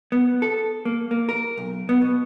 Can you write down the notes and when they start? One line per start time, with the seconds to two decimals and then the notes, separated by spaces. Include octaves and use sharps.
0.12 B3
0.42 A4
0.85 A#3
1.11 A#3
1.29 A#4
1.57 B1
1.89 B3
2.01 B2